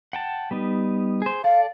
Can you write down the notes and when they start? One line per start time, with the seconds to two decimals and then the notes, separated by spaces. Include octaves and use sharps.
0.13 F#5 G5 A5
0.51 G3 B3 D#4
1.22 G#4 C5
1.44 A4 D5 F5